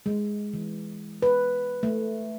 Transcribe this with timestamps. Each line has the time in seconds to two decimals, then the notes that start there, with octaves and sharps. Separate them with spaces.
0.06 G#3
0.54 E3
1.22 B4
1.83 A3